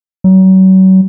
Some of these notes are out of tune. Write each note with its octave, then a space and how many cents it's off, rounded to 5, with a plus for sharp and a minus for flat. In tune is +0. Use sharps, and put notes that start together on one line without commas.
F#3 +35